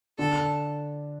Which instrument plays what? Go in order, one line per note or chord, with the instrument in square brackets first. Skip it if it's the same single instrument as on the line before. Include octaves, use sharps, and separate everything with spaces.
[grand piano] D3 D4 [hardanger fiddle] A4